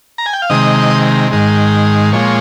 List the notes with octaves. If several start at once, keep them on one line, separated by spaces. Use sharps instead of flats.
A#5
G#5
G5
F5
C3 D#3 G#3 D#5
G#2 D#3 G#3
A#2 F3 G#3 C#5